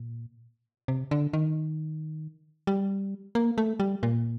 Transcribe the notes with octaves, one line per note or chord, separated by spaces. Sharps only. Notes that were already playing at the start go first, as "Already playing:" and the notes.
Already playing: A#2
C3
D3
D#3
G3
A#3
A3
G3
A#2